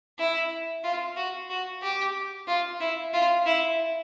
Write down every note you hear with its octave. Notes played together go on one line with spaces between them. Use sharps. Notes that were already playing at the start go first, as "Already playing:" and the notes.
E4
F4
F#4
F#4
G4
F4
E4
F4
E4